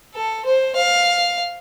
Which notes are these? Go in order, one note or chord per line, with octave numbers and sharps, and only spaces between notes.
A4
C5
F5